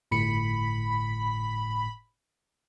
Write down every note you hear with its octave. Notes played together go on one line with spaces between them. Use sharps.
G1 A2 B5 C#7